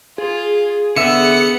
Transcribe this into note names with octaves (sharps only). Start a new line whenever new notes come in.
F4 G#4
D3 B3 E5 F#5 C#7